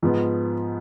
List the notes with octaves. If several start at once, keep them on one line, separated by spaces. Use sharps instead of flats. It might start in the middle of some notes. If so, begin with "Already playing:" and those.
G#2 F3 B3